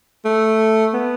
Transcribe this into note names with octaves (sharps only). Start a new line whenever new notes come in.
A3
B3